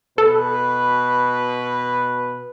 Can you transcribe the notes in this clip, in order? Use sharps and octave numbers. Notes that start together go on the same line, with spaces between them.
B2 A4 B4